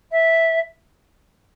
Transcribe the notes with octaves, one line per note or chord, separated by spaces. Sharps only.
E5